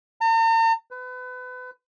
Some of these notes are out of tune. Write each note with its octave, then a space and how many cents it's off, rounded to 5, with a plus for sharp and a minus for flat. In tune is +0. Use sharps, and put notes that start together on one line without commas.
A#5 -45
B4 +30